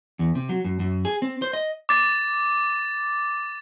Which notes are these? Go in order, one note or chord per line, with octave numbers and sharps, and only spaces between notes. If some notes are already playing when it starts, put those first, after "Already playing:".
E2
C3
F#3
F#2
F#2
G#4
C4
C5
D#5
D6 A6